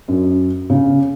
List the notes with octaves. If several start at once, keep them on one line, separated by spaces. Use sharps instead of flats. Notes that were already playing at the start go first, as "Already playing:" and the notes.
F#2
C#3